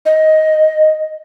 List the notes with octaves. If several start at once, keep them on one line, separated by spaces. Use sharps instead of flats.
D#5